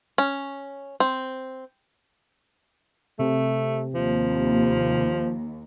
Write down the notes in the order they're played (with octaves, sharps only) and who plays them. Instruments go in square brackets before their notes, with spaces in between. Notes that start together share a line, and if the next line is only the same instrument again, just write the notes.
[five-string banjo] C#4
C4
[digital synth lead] C3 [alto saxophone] A3
[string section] D#2 [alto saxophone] F3